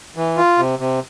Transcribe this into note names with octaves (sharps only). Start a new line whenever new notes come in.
E3
F4
C3
C3